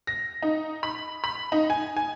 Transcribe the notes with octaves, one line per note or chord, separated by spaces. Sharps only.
A#6
D#4
B5
B5
D#4
G#5
G#5